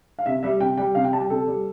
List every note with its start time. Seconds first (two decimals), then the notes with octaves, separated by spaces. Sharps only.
0.19 F5
0.26 C3 E5
0.43 G3 E5
0.60 C3 G5
0.78 G3 G5
0.95 C3 F5
1.04 G5
1.12 G3 A5
1.21 G5
1.30 C3 A4
1.47 G3